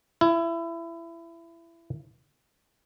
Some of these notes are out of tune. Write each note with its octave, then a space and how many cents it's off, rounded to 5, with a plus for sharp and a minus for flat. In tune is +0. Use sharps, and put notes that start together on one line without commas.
E4 +25